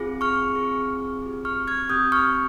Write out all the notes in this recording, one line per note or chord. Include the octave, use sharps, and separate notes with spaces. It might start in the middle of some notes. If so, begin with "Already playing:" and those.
Already playing: C4 F4 G#4
C#6 F6
C4 F4 G#4
C4 G4
C#6 F6
F6 G#6
C4 G4 D#6 G6
C#6 F6